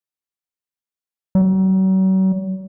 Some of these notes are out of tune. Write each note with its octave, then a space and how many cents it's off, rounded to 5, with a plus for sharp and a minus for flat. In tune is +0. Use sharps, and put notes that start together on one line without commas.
F#3 +40